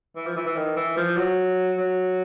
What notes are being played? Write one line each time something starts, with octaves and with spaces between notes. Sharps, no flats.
E3
F3
E3
E3
D#3
E3
F3
F#3
F#3